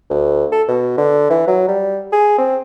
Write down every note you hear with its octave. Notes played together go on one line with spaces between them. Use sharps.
D2
A4
B2
D3
E3
F#3
G3
G#4
C4